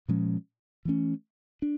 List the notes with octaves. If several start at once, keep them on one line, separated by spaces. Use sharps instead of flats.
A#2 F3 G#3 C#4
E3 A3 C#4
D4